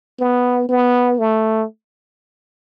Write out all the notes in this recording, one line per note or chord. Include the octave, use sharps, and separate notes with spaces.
B3
B3
A3